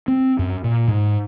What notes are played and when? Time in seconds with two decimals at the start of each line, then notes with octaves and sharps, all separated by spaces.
0.08 C4
0.39 F#2
0.64 A#2
0.88 G#2